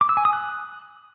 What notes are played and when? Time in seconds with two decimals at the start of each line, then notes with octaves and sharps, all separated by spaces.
0.01 D6
0.09 E6
0.17 G#5
0.25 D#6
0.33 F#6